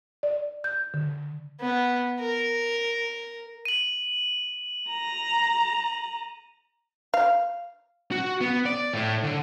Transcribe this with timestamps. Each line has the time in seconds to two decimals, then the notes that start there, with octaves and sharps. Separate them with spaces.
0.23 D5
0.64 G6
0.94 D3
1.61 B3
2.20 A#4
3.65 D#7 F#7
4.90 A#5
7.14 F5
8.11 F#4
8.41 B3
8.66 D5
8.94 A2
9.23 D3